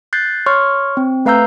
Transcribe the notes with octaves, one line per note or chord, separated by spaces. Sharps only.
F#6 G6 A6 C7
C#5 C6 C#6 F6
C4
A3 B4 F5 A#5 E6 G6